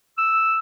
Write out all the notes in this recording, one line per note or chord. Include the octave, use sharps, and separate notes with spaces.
E6